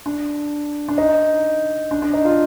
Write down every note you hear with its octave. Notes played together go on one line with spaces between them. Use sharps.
D4
D4
D#4
D4
D4
D#4
F4